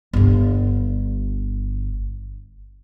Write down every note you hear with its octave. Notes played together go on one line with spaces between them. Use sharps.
G1 D3